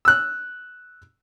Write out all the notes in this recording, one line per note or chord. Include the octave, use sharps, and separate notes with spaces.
E6 F#6